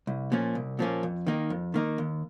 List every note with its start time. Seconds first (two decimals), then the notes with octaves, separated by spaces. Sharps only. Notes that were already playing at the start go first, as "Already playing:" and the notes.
0.07 C2
0.32 A#2 F3 A#3 C#4
0.55 C2
0.79 A#2 F3 A#3 C#4
1.03 F2
1.27 D#3 A#3 D#4
1.50 F2
1.74 D#3 A#3 D#4
1.98 D#2